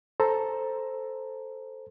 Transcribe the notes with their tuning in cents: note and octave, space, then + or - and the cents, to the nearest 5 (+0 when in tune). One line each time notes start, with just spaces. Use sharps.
A4 +0 C5 +0 A#5 +5